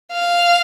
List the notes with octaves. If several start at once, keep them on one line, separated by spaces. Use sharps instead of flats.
F5